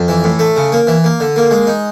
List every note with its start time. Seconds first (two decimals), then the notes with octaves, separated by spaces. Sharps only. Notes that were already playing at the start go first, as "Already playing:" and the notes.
Already playing: F2
0.08 E3
0.24 A2
0.39 A3
0.56 C#3
0.72 A#3
0.87 E3
1.04 A#3
1.20 D3
1.36 A#3
1.51 G#3
1.67 D#4